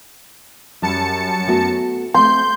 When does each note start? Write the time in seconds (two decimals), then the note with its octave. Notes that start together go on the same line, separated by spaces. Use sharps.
0.82 F#2 G3 A5 C#7
1.47 A3 B3 F#4
2.14 A3 C4 C6 G6